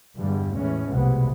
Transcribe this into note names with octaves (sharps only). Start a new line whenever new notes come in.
E2 G2 D3 G3 G#3
A2 E3 G#3 C#4
F1 C2 B2 G#3 B3